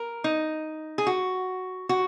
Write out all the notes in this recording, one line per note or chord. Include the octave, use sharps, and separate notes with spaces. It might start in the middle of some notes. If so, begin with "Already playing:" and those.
Already playing: A#4
D#4
G#4
F#4
F#4